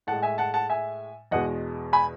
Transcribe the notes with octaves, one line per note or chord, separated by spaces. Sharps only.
A2 G#3 F#5 A5
E5 G#5
F#5 A5
F#5 A5
E5 G#5
E2 B2 G#3 D#5 F#5
G#5 B5